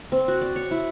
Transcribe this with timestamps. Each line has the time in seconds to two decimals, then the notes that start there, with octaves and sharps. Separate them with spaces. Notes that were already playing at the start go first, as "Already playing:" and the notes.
0.12 C4
0.28 F#4
0.41 D5
0.56 C#5
0.71 E4